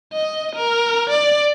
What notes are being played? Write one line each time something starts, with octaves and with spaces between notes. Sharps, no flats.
D#5
A#4
D5